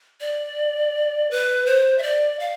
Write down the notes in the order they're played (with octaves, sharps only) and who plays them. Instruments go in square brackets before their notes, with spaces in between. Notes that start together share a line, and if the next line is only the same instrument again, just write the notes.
[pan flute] D5
B4
C5
E5
D5
F5